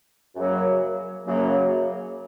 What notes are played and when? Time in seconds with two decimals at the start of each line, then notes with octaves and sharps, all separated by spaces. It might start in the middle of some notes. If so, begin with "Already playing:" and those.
0.35 F#2 C#3 F#3 A#3
1.24 F#2 C#3 F#3 A#3